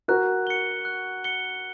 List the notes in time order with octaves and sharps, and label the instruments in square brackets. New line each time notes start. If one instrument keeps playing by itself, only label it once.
[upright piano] F#4 A#4 [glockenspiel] F#6
[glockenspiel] C#7 G7
F#6
C#7 G7